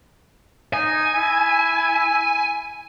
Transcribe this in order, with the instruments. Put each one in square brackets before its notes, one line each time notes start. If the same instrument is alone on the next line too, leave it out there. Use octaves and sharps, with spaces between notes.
[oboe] D#4 [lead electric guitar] G#5
[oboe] E4